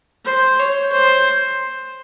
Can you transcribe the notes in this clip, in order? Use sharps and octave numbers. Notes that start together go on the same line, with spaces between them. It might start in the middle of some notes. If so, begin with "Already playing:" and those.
C5
C#5
C5